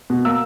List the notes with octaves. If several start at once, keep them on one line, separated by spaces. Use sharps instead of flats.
B2
A#3 E6